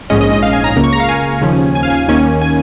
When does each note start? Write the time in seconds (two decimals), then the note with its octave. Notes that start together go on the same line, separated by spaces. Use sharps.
0.10 A#1 G#2 G#3 C#4 D#5
0.21 D#5
0.31 D#5
0.43 F5
0.53 G#5
0.64 A#5
0.76 C#2 C#3 A#3 A#5
0.84 C#6
0.93 A#5
1.00 F5
1.09 G#5
1.41 D#2 C#3 F3 C#4
1.75 G#5
1.83 F5
1.90 G#5
2.08 D#2 D#3 A#3 C#4 G#5
2.41 G#5